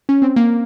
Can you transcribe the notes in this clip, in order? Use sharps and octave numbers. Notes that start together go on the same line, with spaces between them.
C#4
C4
A#3